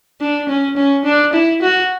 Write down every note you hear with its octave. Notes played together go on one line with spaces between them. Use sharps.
D4
C#4
C#4
D4
E4
F#4